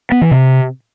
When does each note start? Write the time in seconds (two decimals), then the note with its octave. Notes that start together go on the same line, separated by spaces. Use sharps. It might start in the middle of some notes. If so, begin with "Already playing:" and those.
0.12 B3
0.21 E3
0.31 C3